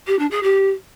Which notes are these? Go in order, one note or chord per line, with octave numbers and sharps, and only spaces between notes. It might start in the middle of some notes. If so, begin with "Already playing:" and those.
G4
D4
G#4
G4